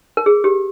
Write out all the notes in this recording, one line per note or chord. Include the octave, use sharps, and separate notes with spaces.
A#4
G#4
G4